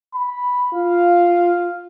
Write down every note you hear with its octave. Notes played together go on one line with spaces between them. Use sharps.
B5
F4 F5